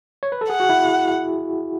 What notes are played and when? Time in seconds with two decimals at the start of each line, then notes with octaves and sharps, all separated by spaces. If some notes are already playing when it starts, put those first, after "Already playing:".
0.23 C#5
0.32 B4
0.41 A4
0.50 G#4 F#5
0.60 F#4
0.69 E4